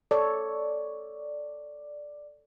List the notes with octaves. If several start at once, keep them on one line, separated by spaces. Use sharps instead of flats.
A4 C#5 D5